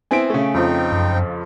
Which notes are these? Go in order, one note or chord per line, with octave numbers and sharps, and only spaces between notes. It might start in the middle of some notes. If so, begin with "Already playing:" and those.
B3 C4 E4 G#5 D7
C#3 A3
F2 F3 C4 D#4 G5
F#2